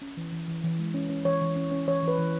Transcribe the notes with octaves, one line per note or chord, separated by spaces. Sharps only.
C#4
E3
E3
E3
E3
G#3
C#4
C#4
E3 C#5
E3
C#4
C#4
E3 C#5
E3 B4
E3